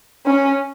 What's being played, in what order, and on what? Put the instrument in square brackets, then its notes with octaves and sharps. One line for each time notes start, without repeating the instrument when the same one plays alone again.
[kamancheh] C#4